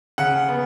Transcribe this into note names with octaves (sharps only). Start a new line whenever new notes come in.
C#3 F#5
B3